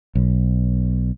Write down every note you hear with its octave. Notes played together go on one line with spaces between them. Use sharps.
B1